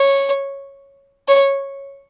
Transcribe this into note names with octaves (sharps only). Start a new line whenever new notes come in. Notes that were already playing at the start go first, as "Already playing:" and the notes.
Already playing: C#5
C#5